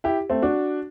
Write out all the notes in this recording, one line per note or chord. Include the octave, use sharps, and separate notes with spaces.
E4 G4
A3 C4
D4 F#4